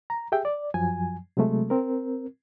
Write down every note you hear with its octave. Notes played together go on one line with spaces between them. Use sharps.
A#5
G4 G#4 E5 G5
D5
F#2 F3 F#3 G#5
C3 F#3 G#3 A3
C4 A#4